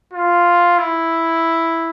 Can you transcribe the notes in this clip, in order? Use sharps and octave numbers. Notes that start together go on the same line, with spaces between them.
F4
E4